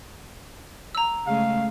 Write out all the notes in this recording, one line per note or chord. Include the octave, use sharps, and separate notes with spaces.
A#5 E6
C#3 G#3 A3 F5